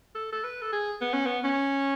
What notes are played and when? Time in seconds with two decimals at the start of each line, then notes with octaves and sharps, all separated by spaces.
0.15 A4
0.32 A4
0.44 B4
0.62 A4
0.73 G#4
1.01 B3
1.13 C#4
1.26 B3
1.44 C#4